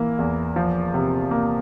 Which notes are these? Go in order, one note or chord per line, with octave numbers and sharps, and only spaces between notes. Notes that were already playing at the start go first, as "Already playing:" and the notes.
Already playing: E3 A#3
E2
F3
C3
A#3